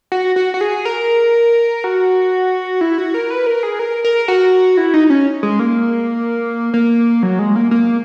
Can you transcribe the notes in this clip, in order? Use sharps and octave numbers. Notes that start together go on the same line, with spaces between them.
F#4
F#4
F#4
G#4
A#4
F#4
E4
F#4
A#4
B4
A#4
G#4
A#4
A#4
F#4
E4
D#4
C#4
G#3
A#3
A#3
F#3
G#3
A#3
A#3